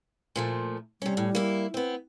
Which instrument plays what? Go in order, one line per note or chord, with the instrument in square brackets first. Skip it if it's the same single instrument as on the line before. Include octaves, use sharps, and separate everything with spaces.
[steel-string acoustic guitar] A#2 F3 A3
[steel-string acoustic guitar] C3 C#4 [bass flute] G3
[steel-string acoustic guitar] A2
A#3 E4
B3 C4